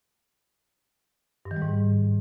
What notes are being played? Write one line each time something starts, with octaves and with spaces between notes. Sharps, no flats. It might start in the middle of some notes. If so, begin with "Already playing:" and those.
G2
D#3
G3
G#2